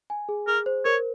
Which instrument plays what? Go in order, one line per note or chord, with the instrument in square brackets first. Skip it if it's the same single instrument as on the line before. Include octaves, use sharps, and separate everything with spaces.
[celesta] G#5
G#4
[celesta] G#4 [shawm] A#4
[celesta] C5
[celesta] A#4 [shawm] C#5